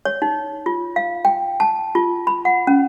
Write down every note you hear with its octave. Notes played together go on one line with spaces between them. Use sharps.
C#5
D#4
F4
F5
G5
A5
F4
B5
F#5
C#4